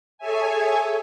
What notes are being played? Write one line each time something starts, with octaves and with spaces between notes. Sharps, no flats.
G#4 A4 C#5 E5 G#5